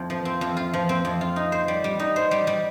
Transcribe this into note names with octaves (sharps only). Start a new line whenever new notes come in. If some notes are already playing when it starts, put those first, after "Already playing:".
Already playing: F2
F3
C4
F2
F4
F3
C4
F2
F4
D#4
C5
G3
G3
D#4
C5
G3
G3